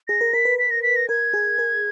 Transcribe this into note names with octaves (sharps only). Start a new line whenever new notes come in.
G#4 A#6
A#4
A#4 B6
B4
B6
A#6
B6
A#6
A#4 G#6
G#4
A#4